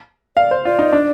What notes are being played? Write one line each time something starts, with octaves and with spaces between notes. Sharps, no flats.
D5 F5
C5
F4 D5
D#4
D4